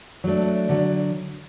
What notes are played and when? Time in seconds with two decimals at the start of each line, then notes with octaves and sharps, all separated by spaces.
0.24 F#3 A3 D4
0.69 D3 F#3